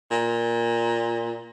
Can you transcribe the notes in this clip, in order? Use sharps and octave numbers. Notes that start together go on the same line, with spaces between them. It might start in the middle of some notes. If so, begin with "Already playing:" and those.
A#2